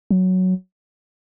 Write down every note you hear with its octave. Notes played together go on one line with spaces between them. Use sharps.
F#3